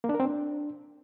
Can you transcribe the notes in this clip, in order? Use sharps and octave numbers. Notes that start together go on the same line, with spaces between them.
A#3
D4
A#4
C4
D4